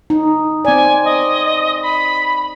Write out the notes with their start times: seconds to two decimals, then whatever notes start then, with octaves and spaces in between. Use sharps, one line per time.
0.10 D#4
0.65 C4 D5 G#5
1.04 D#5
1.83 B5